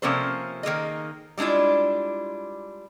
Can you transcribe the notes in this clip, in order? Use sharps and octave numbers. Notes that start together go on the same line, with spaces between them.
C3 F3 A#3 C#4 A4 C5
D#3 A#3 G#4 D#5
G3 G#3 D4 E4 F4